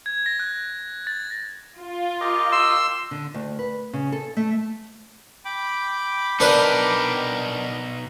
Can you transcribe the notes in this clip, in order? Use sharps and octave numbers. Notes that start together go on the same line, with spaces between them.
G#6
A#6
F#6
A6
F4
G4 A#4 D#5
C6 E6
D3
D2
B4
C#3
A4
A3
G5 B5 D6
B2 D4 D#4 A#4 B4